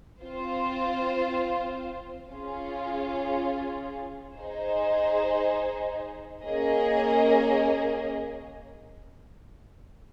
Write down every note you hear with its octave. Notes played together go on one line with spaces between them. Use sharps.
C4 F4 C5
C#4 F4 G#4
D#4 G#4 C5
A#3 C#4 G#4 D#5